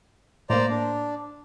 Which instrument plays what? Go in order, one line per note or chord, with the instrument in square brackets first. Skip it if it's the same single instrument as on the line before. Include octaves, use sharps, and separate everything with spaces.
[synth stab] A2 A#3 [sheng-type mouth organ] C5 D5 A#5
[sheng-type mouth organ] D4